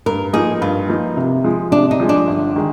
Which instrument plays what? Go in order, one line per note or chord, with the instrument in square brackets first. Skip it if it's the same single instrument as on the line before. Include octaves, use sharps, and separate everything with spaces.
[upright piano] G2 [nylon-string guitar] A#4
[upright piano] F3 A#3 D#4 [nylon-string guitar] G#4
[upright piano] G2 [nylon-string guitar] F4
[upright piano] F3 A#3 D#4
C3
F3 G#3
[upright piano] C3 [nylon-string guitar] D4
[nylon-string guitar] D#4
[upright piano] F3 G#3
[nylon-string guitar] D4
[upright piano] G1
D#3 G#3